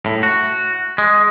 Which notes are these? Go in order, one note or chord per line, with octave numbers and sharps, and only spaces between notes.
A2
F#4
G#3